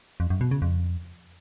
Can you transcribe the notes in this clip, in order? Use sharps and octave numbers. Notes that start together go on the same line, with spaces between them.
F2
F#2
B2
C#3
F2